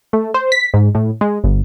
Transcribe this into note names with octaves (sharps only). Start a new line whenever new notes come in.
A3
C5
B6
G#2
A2
G#3
G1